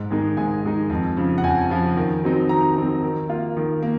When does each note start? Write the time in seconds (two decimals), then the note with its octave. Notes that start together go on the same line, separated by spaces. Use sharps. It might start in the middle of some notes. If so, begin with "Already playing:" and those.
Already playing: G#2
0.11 D#3 G#3 D#4
0.37 G#2 G#5
0.63 D#3 G#3 D#4
0.90 F2
1.17 C#3 F3
1.38 F#5
1.44 F2 G#5
1.70 C#3 F3
1.96 D#3
2.23 F#3 C4 D#4
2.49 D#3 A#5
2.76 F#3 C4 D#4
3.03 D#3
3.29 A#3 F4
3.57 D#3
3.83 A#3